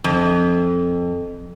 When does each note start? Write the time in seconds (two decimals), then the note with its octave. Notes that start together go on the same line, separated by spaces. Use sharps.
0.04 F2